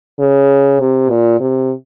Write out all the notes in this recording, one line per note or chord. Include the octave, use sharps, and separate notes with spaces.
C#3
C3
A#2
C3